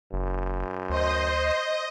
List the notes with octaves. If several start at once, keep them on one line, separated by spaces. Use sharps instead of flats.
F#1 F#2
D2 C5 D#5